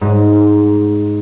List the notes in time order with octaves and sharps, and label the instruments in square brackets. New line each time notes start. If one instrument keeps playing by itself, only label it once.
[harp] G#2